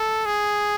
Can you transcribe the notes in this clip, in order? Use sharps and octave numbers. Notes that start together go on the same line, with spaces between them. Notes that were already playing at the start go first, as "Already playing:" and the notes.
Already playing: A4
G#4